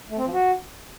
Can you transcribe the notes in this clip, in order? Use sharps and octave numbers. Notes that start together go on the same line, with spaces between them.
A3
C4
F3
F#4